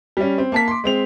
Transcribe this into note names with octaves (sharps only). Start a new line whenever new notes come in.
G3 C#4
C4
A#3 A5 B6
C6 D6
G#3 C4 F7